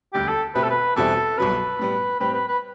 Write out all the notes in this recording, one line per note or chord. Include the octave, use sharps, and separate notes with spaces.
E1 D2 D3 G3 G4
A4
B2 A3 C4 G4 B4
A4
B4
E2 B2 G3 C4 E4 A4
C2 B2 F#3 B3 B4
A2 G3 B3
A2 G3 C4 G4 B4
B4
B4